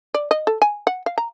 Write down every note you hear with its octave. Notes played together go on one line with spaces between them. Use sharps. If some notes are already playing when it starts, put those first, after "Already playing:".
D5
D#5
A4
G#5
F#5
F5
A#5